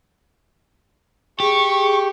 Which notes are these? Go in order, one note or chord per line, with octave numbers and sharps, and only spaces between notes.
G4 G#4 C#6